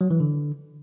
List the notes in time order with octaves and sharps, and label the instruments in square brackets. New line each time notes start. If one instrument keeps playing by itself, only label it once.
[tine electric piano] F#3
E3
D3